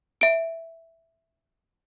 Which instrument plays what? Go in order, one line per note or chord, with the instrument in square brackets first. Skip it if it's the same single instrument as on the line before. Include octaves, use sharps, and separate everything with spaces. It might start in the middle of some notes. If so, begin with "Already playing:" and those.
[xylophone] E5 D7